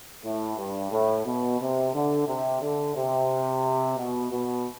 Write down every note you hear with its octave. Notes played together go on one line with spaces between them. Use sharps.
A2
G2
A2
B2
C3
D3
C3
D3
C3
B2
B2